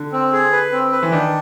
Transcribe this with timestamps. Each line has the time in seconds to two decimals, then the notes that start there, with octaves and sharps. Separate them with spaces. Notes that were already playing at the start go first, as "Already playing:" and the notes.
Already playing: D3
0.13 C4
0.33 G#4
0.52 B4
0.72 C4
0.92 B4
1.03 E3
1.12 D#3 D4